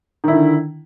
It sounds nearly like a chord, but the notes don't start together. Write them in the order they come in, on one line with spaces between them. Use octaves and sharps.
D#3 E4 D3